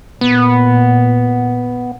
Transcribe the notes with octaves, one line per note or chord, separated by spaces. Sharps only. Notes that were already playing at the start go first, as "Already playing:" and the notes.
A#2 B3